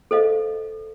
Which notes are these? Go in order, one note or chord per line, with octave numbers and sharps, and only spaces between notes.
A4 C5 D#5 F5